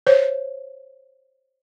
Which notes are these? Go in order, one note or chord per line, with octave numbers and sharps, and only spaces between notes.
C5 C#5